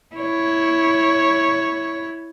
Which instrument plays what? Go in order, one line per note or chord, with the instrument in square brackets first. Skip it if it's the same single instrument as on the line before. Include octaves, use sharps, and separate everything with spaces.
[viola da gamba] E4 C#5